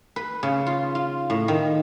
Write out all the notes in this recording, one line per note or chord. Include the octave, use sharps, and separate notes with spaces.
B4
C#3
F4
F4
A2
D#3